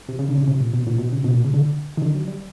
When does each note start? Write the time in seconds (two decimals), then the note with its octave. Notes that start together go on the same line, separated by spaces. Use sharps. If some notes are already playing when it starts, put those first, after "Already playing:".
0.09 C3
0.19 C#3
0.29 D3
0.38 C#3
0.48 C3
0.60 A#2
0.74 B2
0.87 A#2
0.98 B2
1.12 C#3
1.24 B2
1.35 A#2
1.44 C#3
1.54 D3
1.97 D#3
2.02 D3
2.14 F#3
2.28 G3